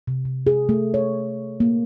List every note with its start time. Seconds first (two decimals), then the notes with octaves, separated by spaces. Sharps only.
0.07 C3
0.25 C3
0.47 G#4
0.69 A3
0.94 C#5
1.60 A#3